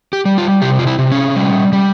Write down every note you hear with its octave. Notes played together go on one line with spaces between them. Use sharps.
G4
G3
F4
C3 G4
F4
E4
C3
C#4
G3
G3